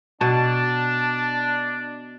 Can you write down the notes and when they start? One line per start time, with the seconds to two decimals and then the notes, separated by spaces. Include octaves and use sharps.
0.21 B2 D4 A5